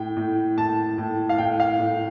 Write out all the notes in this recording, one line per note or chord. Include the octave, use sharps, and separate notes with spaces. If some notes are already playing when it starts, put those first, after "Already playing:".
Already playing: A2 G5
A2
A2 A5
A2
F5
A2 G5
F5
A2